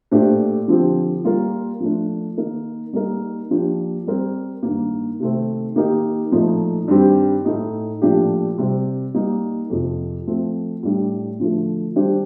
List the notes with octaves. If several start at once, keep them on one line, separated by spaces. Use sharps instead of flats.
A#2 A3 D4 G4 C5
D3 F3 C4 G4
G3 A#3 F4 A#4
F3 A3 D4
D#3 A#3 D#4 A#4
G3 A#3 D#4 A#4
F3 A#3 D4 G4
G3 C4 G4 A#4
G2 D#3 A#3
C3 D#3 A3 C4
D#3 A#3 D#4 G4 A#4
A#2 F3 A3 D#4
G2 D#3 G3 C4 G4
A2 A3 D#4
A#2 F3 A3 D4 G4
C3 G3 C4
G3 A#3 D#4
F2 C3 F3
F3 A3 C4
A2 G3 D4
D3 F3 A3
D#3 G3 D4 G4 C5